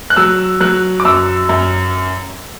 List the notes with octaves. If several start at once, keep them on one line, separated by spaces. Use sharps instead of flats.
F#6
F#3 E6
F#3 F#6
D6
F#2 E6
F#2